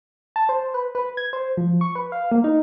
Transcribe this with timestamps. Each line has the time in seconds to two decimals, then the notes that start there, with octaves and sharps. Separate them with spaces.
0.36 A5
0.49 C5
0.74 B4
0.95 B4
1.17 G#6
1.33 C5
1.57 F3
1.81 C#6
1.95 B4
2.12 F5
2.32 A#3
2.44 D#4